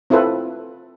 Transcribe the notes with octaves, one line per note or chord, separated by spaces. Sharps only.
C4 E4 F4 A4 B4